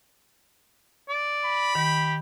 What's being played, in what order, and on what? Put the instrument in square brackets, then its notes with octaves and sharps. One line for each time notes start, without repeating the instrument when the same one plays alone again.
[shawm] D5
[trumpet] B5
[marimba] D#3 [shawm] G4